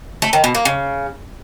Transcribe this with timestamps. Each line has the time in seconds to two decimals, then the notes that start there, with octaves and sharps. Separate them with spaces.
0.22 A3
0.33 D#3
0.44 B2
0.55 A#3
0.65 C#3